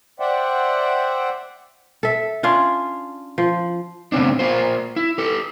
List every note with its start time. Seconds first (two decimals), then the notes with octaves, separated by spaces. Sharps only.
0.20 C5 D5 E5 F#5 G5
2.03 A4 E5
2.43 C#4 D4 F4
3.38 F3
4.12 A2 C#3 B3 C4 D4
4.39 A#3 F4 C5
4.96 E4
5.18 G4 A4